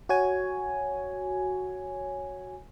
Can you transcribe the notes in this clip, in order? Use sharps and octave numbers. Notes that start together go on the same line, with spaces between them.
F#4 C#5 G#5